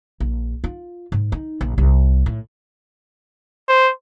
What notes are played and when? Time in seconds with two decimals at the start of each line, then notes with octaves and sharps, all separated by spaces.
0.20 A#1
0.64 F4
1.12 G#2
1.32 D#4
1.61 A#1
1.78 C2
2.26 A2
3.68 C5